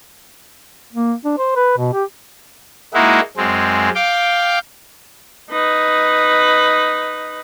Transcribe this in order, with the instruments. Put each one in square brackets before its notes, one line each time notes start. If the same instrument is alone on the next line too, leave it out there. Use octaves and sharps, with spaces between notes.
[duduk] A#3
D4
C5
B4
B2
G4
[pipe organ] G#3 A#3 D#4 E4 F#4
F#2 G#3 C4
F5 G5 D6
[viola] D#4 B4